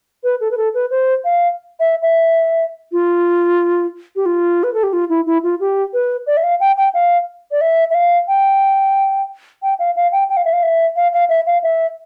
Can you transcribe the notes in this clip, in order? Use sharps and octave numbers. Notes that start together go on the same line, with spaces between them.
B4
A4
B4
A4
B4
C5
F5
E5
E5
F4
G4
F4
B4
A4
G4
F4
E4
E4
F4
G4
B4
D5
E5
F5
G5
G5
F5
D5
E5
E5
F5
G5
G5
F5
F5
G5
G5
F5
E5
F5
E5
F5
F5
E5
F5
E5